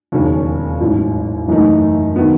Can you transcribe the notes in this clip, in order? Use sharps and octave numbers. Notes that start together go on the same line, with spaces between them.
E1 D#2 C#3 F#3 C#4
A1 G#2 F#3
F#1 F#2 E3 A3 D#4
D#3 F#3 B3